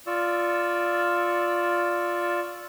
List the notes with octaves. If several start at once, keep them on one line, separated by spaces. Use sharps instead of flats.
F4 D5 C#6 E6